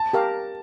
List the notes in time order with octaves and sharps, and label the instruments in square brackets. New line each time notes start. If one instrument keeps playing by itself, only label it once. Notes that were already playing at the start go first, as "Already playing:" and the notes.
Already playing: [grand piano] A5
[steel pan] G4 A#4 F5